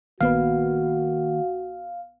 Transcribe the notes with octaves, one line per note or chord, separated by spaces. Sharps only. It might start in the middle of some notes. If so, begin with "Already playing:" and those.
A#1 D#3 A#3 B3 F#4 B4 F5